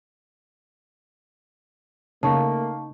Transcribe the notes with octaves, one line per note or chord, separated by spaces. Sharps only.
C#3 A3 A#3 D#4 A5 C#6